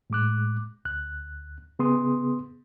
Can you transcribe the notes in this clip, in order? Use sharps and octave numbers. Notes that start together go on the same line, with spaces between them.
A2 G#3 D6 F#6
D2 F#6
C#3 B3 G#4 C6 D#6